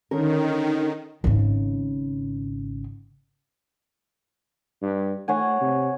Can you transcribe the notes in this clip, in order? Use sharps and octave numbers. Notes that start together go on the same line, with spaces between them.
D3 D#3 C#4 A#4
G#1 C#3
G2
A3 C#5 F#5 G#5
C3